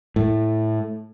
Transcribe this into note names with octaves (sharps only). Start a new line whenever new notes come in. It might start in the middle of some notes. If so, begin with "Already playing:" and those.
A2